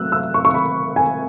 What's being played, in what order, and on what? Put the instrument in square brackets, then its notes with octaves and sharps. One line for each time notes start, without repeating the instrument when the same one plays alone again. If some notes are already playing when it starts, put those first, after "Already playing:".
Already playing: [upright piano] F#3 A3 E6 F#6
E6
C#6
C#6
B5
G#5